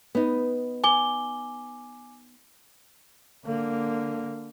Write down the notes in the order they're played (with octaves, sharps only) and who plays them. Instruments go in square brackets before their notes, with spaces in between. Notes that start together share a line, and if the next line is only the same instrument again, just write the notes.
[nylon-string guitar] B3 D#4
[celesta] G#5 D6 G7
[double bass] D3 A#3